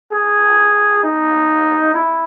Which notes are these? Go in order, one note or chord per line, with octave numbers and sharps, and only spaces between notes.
G#4
D#4
E4